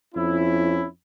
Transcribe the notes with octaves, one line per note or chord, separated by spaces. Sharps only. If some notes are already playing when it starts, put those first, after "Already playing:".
F2 C#4 E4